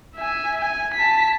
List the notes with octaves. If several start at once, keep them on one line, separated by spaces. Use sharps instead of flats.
E5 G#5
G#5
A5 B6